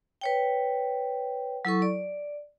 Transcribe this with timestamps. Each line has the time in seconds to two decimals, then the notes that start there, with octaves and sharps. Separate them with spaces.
0.21 B4 C#5 G5
1.65 F#3 E4 A4 C#6
1.82 D5